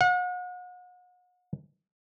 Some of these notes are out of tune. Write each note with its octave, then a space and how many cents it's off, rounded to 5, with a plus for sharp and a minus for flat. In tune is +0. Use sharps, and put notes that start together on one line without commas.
F#5 -40